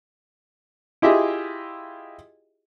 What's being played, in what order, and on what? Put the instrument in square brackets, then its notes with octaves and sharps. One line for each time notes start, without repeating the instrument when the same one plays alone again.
[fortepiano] E4 F4 G4 G#4 D#5 E5